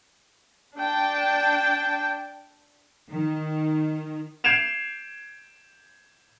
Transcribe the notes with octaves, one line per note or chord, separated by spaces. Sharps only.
D4 G5 A5
D#3
G6 G#6 C7 D7 E7 F7